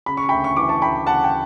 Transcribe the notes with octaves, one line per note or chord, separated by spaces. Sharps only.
C#3 B5
C#6
D2 G5 B5
C#6
E3 D6
A5 C#6
D2 G5 B5
C#3 F#5 A5
G5